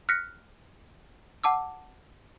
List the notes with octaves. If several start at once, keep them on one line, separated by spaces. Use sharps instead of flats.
F6 F#6 A#6 B6 C#7
F#5 A5 D6 E6